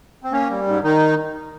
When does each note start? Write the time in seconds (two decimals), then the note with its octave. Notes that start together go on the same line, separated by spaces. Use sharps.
0.24 C4
0.32 A#3 C#4
0.50 G3
0.67 G#2
0.83 D#3 D#4